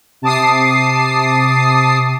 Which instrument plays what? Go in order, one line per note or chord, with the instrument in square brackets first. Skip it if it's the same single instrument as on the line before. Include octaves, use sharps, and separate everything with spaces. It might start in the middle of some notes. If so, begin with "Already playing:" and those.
[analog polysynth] C3 A5 D6 D#6 C7